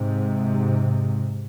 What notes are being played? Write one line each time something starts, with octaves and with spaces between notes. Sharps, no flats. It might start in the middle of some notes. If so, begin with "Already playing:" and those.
Already playing: G#2 C3